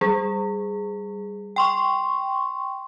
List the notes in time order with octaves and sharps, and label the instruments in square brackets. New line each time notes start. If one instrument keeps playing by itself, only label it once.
[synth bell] G3 G#4
G5 C6 C#6